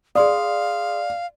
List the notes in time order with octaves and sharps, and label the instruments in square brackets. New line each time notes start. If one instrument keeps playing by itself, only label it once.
[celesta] G#4 C6 D#6 [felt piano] D5 [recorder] F5